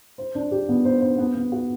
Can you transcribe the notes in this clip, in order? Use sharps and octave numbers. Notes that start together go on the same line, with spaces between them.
C5
D4
G4
B3
C5
C5
B3
B3
F#4